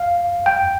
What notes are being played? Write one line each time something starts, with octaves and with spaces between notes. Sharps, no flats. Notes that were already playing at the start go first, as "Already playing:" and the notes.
Already playing: F5
G5